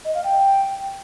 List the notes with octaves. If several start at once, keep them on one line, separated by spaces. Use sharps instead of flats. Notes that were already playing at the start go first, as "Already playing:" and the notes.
D#5
F5
G5